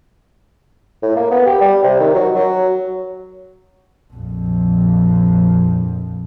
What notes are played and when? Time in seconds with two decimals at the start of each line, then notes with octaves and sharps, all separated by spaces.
1.03 A2
1.16 A#3
1.31 B3
1.46 G4
1.61 G3
1.83 C3
2.00 D#3
2.15 F#3
2.35 F#3
4.13 A#1 F2